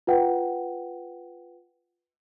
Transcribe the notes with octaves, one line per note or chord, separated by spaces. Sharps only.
F4 B4 F#5 G5